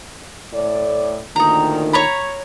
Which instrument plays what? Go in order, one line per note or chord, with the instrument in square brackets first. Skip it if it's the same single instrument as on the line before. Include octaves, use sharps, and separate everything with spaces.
[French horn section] A2 D5
[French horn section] D2 A#2 D#3 [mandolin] D#4 A#5
[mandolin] C#5 A#5 B5